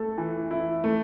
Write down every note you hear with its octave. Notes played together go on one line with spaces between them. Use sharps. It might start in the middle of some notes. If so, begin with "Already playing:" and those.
Already playing: A3 A4
E3
E4
A3